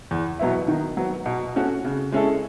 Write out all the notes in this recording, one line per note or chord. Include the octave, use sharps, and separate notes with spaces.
E2
B2 F#3 B3 E4
D#3
F#3 B3
B2
A3 C#4 F#4
C#3
G#3 C#4 E4 A4